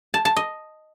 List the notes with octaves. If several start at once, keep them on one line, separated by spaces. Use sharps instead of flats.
A5
A5
D#5